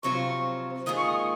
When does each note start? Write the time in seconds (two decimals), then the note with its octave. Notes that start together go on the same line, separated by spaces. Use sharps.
0.03 F2 C3 F#3 C4 F4 C#6
0.86 G#2 D#3 A#3 F4 G#4 D#6
0.97 C#6
1.07 D#6
1.17 C#6